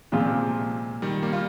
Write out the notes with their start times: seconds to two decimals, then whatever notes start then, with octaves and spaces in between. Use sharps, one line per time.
0.12 A#2 C#3 F3 G#3 C4 F4
0.27 C3
1.02 D#3 G3
1.22 G3 A#3
1.33 G3 A#3 F4